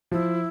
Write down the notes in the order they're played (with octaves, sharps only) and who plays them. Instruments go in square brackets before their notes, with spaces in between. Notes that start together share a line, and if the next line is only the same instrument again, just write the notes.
[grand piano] F3 [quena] E4